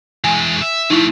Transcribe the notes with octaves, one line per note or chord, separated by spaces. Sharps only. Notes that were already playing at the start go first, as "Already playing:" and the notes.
E3 G#3 G#5
E5
F3 A3 D#4 E4